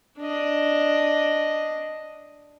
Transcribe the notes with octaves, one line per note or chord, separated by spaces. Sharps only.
D4 D#5